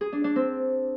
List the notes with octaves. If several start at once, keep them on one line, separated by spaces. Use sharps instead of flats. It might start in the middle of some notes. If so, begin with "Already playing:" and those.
G#4
D4
D4
C4